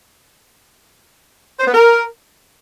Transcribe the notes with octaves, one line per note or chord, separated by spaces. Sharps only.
C5
B3
A#4